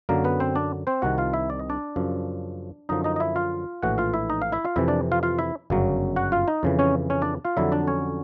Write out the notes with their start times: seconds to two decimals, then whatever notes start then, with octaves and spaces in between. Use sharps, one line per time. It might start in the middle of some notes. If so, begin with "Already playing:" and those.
0.09 F#2 D3 F#3 A#3 A#4
0.24 B3 B4
0.40 C4 C5
0.56 D4 D5
0.87 C4 C5
1.02 C2 C3 D#3 F#4 F#5
1.18 F4 F5
1.33 E4 E5
1.50 D5
1.59 D#5
1.70 D4 D5
1.96 F#2 C#3 F3
2.89 F#2 D3 F3 D#4 D#5
3.04 D#4 D#5
3.16 D#5
3.20 E4 E5
3.36 F4 F5
3.82 A#1 A2 E3 F#4 F#5
3.98 F4 F5
4.14 E4 E5
4.30 D#4 D#5
4.42 F5
4.52 E4 E5
4.65 F4 F5
4.76 F2 C3 E3 E4 E5
4.88 D4 D5
5.12 F4 F5
5.23 F4 F5
5.39 E4 E5
5.70 G1 F#2 C#3 F#3
6.16 F#4 F#5
6.32 F4 F5
6.48 D#4 D#5
6.63 F2 C#3 E3
6.79 C#4 C#5
7.10 C#4 C#5
7.22 D4 D5
7.45 F4 F5
7.57 F2 D3 F#3 E4 E5
7.72 D4 D5
7.87 C#4 C#5